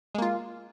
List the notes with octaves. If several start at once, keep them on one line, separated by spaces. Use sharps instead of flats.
G#3 A#3 F4